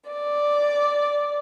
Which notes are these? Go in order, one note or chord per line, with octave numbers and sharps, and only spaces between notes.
D5